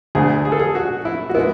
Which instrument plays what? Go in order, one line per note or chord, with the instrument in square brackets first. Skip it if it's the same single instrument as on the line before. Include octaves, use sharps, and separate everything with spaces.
[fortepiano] D2 D3 A3 G#4
G#4
A4
G#4
F#4
E4
F#4
G#3 B3 E4